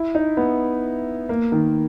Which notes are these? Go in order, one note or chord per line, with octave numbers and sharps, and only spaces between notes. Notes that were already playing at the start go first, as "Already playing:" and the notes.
Already playing: E4
D#4
B3
A#3
D#3